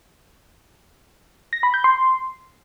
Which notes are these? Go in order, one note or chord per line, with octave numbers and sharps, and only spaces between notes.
A#6
B5
G6
C6